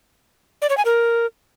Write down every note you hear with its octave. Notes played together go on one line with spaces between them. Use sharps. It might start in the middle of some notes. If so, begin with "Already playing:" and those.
D5
C#5
G#5
A#4